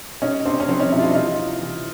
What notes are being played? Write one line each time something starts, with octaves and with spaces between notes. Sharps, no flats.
C3 C#4 D#4
C3 C4 D4
C#4
F3 C4 D4
C#4 D#4
C3 D4 E4
F4
D4 E4
E3 D#4 F4
C3
E3